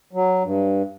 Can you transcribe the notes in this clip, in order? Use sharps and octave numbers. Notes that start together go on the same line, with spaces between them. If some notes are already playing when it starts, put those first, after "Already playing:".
F#3
G2